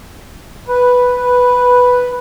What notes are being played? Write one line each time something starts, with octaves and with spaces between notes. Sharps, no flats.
B4